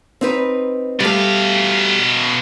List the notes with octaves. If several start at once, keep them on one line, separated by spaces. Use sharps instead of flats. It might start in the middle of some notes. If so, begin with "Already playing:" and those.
C4 D#4 B4
B2 G3 A3 F5